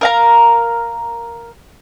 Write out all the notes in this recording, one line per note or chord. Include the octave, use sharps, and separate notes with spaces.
A#4 F5 A#5